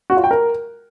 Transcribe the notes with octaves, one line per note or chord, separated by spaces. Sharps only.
F#4
F4
G5
A#4